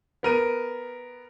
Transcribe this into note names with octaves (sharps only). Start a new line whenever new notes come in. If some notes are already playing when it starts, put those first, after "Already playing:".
B3 A#4 D#7